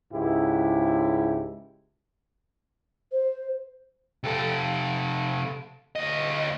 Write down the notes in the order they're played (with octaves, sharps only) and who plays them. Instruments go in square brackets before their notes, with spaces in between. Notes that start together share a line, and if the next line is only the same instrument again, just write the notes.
[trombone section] C#2 G#2 E4 G4
[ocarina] C5
[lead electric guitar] C3 A4
D2 D#5